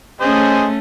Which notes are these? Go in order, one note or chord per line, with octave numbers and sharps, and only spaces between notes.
A3 C#4 G#4 C5 D#5